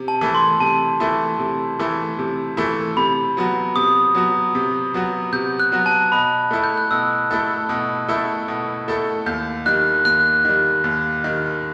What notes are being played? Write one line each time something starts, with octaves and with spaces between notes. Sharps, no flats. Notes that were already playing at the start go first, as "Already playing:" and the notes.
Already playing: C3
A5
E3 A3 E4
C6
C3 A5
E3 A3 E4
C3
E3 A3 E4
C3
E3 A3 E4
C3 B5
F#3 B3 F#4
C3 D#6
F#3 B3 F#4
C3
F#3 B3 F#4
C3 G6
F#6
F#3 B3 F#4
A5
B2 B5
A3 E4 A4
G6
F#6
B2 E6
A3 E4 A4
B2
A3 E4 A4
B2
A3 E4 A4
D#2 G6
D#3 G3 F#6
D#2 F#6
D#3 G3
D#2
D#3 G3